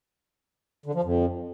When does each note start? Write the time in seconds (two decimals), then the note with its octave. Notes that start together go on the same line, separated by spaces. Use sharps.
0.86 D3
0.95 F3
1.04 F2